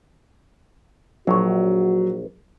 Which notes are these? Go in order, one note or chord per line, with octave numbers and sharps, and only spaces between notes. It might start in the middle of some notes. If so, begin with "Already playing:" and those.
A#1 F#3 F#4 C#5